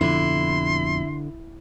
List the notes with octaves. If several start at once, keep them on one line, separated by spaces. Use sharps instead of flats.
F2 B2 D3 F3 E4 C6